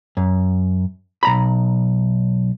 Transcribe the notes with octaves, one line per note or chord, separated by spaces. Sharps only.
F#2
B1 A#5 B5